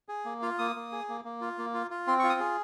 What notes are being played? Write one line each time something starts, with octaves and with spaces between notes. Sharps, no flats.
G#4
A#3
F4 F5
A#3 D#6
A#3
G#4
A#3
A#3
F4
A#3
F4
F4
C4 C6
F4 C#6
D#6
G#4